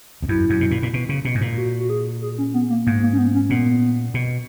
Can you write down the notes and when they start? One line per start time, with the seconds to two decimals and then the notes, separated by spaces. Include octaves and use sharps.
0.23 E2
0.28 F#2 E4
0.50 F#2
0.61 B2
0.71 A#2
0.83 A#2
0.93 B2
1.09 C#3
1.25 B2
1.35 G#2
1.41 A#2
1.57 F#4
1.80 F#4
1.90 G#4
2.22 G#4
2.38 C#4
2.54 B3
2.70 A#3
2.86 G#2 A#3
3.02 A#3
3.13 C#4
3.18 B3
3.34 C#4
3.50 A#2 B3
4.14 B2